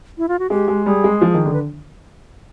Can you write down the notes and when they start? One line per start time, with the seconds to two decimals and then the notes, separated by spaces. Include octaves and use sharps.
0.18 E4
0.28 F4
0.39 F#4
0.50 G#3 G4
0.68 G#3
0.86 G3 G#4
1.04 G#3
1.21 F3
1.34 D#3
1.46 D3
1.53 B4